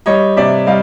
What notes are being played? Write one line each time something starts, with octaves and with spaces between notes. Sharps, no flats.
G3 C#5 D#5
C3 D5 E5
G3 D#5 F5